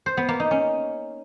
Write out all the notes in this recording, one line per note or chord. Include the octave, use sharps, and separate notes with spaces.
C5
B3
A#3
D#4
C#4